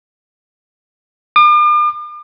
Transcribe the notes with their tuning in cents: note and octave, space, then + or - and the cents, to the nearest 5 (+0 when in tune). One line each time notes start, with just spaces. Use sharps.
D6 +45